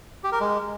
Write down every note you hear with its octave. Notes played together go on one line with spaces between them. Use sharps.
G4
A#4
G#3